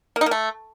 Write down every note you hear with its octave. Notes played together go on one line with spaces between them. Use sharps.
A#3
D#4
A#3
A3